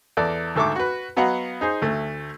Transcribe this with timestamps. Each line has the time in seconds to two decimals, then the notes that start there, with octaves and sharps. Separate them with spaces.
0.17 E2 A4 D5
0.56 D2 G#2 A4 E5 C#6 D6
0.76 F#4 B4
1.17 F#3 B3 D#5 F5 F#5
1.61 D#4 G#4 C5
1.82 D2 A3